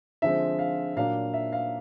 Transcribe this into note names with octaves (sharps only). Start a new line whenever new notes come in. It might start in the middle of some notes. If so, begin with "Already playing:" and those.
D3 F3 G#3 C4 E5
F5
A#2 F#3 A#3 D4 F5
E5
F5